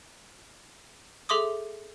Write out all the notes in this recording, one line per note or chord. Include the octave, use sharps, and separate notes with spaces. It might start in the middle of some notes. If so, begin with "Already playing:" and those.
G#4 A4 E5 C6 D6 D#6